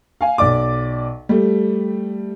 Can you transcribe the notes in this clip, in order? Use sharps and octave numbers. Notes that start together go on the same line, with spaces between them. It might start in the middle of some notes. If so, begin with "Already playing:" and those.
F5 G#5
B1 D5 D6
G3 A3